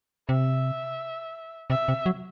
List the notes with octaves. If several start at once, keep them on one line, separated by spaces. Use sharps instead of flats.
C3 E5
C3 E5
C3
F#3